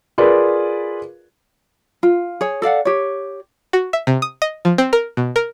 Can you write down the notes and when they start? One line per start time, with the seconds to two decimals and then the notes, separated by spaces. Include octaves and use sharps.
0.18 F4 G#4 A#4 B4 D5
2.03 F4
2.41 G#4 C#5
2.62 A4 D5 F5 F#5
2.85 G4 C#5
3.73 F#4
3.93 E5
4.07 C3
4.22 D#6
4.42 D#5
4.65 F3
4.78 C4
4.93 A#4
5.17 B2
5.36 A#4